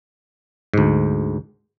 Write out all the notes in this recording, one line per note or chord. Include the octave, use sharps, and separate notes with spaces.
D2 G#2